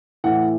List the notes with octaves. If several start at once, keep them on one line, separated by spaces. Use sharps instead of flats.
A2 E3 F#5